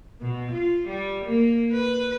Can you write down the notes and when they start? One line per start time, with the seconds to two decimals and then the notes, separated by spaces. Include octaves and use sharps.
0.21 B2
0.52 F4
0.88 G3
1.25 A#3
1.73 B4